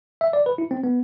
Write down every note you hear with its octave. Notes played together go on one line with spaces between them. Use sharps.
E5
D5
B4
E4
C4
B3